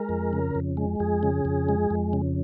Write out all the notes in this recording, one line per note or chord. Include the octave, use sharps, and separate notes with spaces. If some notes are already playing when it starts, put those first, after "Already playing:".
Already playing: G#3 A#4
F2
C#3
F2
G#3
F2 G#4
C#3
F2
G#3
F2
C#3